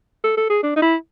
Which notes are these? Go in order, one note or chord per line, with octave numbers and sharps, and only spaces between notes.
A4
A4
G#4
D4
D#4
E4